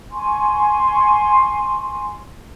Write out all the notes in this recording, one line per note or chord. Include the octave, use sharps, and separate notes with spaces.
G#5 C6 C#6